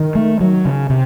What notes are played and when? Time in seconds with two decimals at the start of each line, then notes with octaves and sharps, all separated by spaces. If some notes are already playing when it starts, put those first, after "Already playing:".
Already playing: D#3
0.15 A3
0.41 F#3
0.65 C#3
0.90 C3